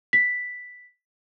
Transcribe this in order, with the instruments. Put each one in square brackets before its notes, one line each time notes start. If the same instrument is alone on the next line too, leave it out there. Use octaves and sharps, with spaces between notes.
[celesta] B6